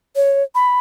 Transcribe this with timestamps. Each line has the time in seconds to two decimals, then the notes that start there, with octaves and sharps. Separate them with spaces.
0.16 C#5
0.55 B5